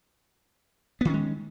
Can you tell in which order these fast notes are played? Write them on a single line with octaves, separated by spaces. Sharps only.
B3 D#3 C#4 G#3